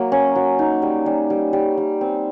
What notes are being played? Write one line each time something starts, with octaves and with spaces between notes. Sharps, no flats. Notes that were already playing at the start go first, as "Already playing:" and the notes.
Already playing: F#3 A#3
C#4
F#3
D#4
G3
G3
G3
G3
G3
C4